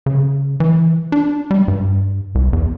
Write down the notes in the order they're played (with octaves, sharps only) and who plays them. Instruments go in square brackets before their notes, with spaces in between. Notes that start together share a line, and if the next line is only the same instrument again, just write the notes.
[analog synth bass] C#3
E3
D4
G3
G2
C2
E2